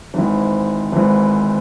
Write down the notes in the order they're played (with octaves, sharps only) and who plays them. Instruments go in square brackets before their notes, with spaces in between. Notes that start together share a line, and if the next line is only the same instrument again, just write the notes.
[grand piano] G#1 G#2 E3
G#1 G#2 E3